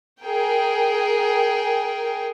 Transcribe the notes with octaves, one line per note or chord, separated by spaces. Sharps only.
G#4 A#4 G5